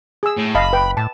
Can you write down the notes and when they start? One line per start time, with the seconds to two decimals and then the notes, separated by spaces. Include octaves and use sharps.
0.23 G#4 E6
0.38 A2
0.55 F#1 D#5 F5 A5 B5
0.73 B4 G5
0.97 A2 A5